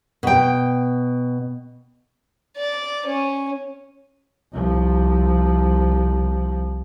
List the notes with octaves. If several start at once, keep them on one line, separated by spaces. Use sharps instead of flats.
B2 G5
D5
C#4
C2 F3